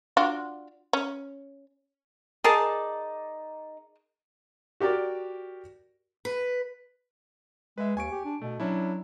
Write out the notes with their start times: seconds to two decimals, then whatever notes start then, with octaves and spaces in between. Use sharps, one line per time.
0.17 D4 F4 F#4
0.93 C#4
2.44 D#4 G#4 A#4 D5 A5
4.80 F#4 G4 A#4 D5
6.25 B4
7.78 G#3 B4 E5
7.97 D#2 G#5 C#6 D7
8.12 G4
8.25 D4
8.42 B2 A3
8.60 F#3 C#4 D4 E4